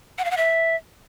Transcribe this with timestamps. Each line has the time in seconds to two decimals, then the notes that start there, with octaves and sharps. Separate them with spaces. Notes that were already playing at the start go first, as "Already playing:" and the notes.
0.18 F#5
0.25 F5
0.31 F#5
0.37 E5